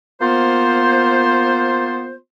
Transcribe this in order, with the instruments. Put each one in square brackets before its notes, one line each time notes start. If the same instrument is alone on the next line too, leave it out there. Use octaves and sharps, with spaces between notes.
[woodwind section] A#3 B3 F4 C5